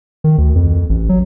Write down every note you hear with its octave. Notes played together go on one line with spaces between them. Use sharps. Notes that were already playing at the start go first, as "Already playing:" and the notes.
D#3
D2
F2
A1
F#3